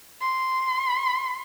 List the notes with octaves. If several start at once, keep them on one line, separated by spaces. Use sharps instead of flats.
C6